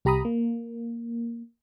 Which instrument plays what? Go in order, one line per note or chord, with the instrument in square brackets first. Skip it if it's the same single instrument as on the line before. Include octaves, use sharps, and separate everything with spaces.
[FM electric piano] C2 G4 A#5 B5 D#6
A#3